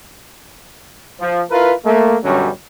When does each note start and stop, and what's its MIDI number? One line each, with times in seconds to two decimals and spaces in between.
1.21 1.42 53
1.51 1.73 64
1.51 1.73 65
1.51 1.73 70
1.51 1.73 71
1.85 2.16 57
1.85 2.16 58
2.24 2.50 42
2.24 2.50 47
2.24 2.50 50
2.24 2.50 54
2.24 2.50 55
2.24 2.50 61